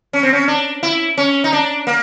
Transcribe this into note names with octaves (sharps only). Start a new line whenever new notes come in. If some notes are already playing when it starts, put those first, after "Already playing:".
C#4
C4
C#4
D4
E4
C#4
D#4
D4
A#3